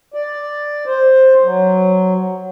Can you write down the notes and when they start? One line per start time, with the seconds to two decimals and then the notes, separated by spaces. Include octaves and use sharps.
0.14 D5
0.87 C5
1.43 F#3